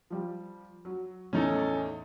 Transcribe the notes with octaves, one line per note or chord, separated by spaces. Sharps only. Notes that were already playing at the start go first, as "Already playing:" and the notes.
F3 G3
F#3
E2 A2 C#4 D#4 A4